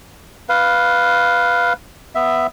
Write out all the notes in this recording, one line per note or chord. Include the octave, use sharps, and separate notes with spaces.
B4 F5
B3 E5